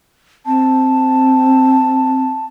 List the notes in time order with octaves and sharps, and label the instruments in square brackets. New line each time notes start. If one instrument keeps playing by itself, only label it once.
[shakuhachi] C4 [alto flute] A5